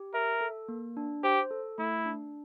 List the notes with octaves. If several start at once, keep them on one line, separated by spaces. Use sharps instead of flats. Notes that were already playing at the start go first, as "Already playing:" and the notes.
Already playing: G4
A#4 E5
A4
A#3
D4
G4 C5
A4
A3 E4
D4